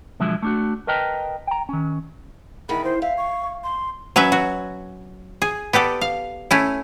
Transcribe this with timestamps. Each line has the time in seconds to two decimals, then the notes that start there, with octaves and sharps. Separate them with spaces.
0.20 B1 D3 F3 F#3 G#3 E5
0.43 A3 D4 F#4
0.87 A#4 B4 D#5 G5 A5 A#5
1.47 G5 A#5
1.69 D#3 C#4
2.69 E2 D#3 B5
2.84 C5
3.02 E5 F5
3.18 C#6
3.64 C6
4.16 F#3 C#4 B4 E5
4.32 F#4
5.42 G#4
5.73 B3 G4 A4 D5
6.01 F5
6.51 A3 C#4 E4